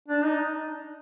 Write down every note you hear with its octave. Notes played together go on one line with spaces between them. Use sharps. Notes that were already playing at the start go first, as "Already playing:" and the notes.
D4
D#4